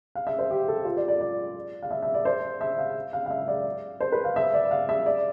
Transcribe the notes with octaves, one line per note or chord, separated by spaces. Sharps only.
F5
E5
C5
G4
A4
F4
D5
D5
D5
F5
E5
E5
D5
C5
E5
F5
F5
F5
E5
D5
C5
B4
F5
E5
D5
F5
E5
D5